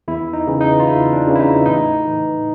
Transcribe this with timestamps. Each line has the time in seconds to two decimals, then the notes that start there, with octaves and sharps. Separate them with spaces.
0.08 E2 E4
0.33 D#4
0.47 C#3 E3
0.61 D#4
0.80 F4
0.86 E2 E4
1.13 D4
1.27 C#3 E3
1.36 E4
1.40 D#4
1.66 A2 D#4
2.06 E3